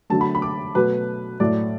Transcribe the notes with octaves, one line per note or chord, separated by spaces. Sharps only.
D3 F#3 A3 A5
B5
B5
D6
B2 F#3 A3 B4
A2 F#3 A3 D5